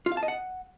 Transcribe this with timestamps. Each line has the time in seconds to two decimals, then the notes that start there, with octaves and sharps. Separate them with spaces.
0.06 F4
0.12 F5
0.17 A5
0.23 D#5
0.28 F#5